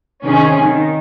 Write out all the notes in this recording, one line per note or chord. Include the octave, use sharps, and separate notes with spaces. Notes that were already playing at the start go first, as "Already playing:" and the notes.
C3 D#3 C#4 G#4
D#3